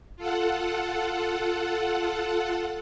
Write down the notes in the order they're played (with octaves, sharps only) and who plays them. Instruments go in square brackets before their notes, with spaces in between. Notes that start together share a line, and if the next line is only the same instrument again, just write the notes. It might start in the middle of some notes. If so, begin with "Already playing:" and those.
[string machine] F4 A4 F#5